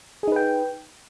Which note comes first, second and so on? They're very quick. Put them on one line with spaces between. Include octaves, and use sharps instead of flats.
G#4 D#4 B4 G5